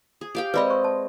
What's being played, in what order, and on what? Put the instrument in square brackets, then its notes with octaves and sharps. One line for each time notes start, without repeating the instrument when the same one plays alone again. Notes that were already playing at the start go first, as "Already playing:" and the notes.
[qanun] G#4
G4 F5 G5
[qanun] G#3 C4 D#5 [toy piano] B4 D5 B5
[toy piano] C#6
A5